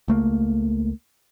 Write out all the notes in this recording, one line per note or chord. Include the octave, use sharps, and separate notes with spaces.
C#2 A3 A#3